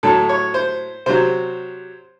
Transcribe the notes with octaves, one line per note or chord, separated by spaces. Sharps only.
A2 F#3 A4
C#5
C5
C3 F#3 C5